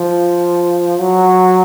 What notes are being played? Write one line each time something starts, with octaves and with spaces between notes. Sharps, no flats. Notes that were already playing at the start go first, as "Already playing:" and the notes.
Already playing: F3
F#3